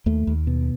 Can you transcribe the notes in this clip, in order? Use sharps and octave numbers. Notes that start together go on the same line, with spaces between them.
D#2 A3
D#2
B2